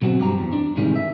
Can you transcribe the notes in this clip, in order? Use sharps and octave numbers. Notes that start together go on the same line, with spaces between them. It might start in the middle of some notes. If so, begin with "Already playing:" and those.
B2 F#3 C4 F#4
G2 G4 A#5
E2
D4
G#2 C3 D#3 E3 G3 G#3
E5